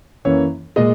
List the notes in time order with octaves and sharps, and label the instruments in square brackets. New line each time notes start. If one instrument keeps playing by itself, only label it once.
[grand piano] F#2 E3 A#3 C#4 C#5
A#2 G#3 D#5